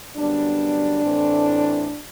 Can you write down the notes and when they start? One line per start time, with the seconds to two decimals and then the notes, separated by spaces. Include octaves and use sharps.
0.16 F#2 D3 G3 B3 D4
1.04 A2 E3 A3 C4